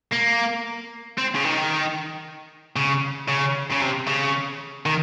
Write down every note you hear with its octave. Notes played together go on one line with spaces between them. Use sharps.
A#3
C4
C#3
D#3
C#3
C#3
C#3
C3
C#3
D#3